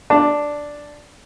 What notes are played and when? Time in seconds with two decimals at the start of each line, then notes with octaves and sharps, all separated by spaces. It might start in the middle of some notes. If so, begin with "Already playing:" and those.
0.10 D4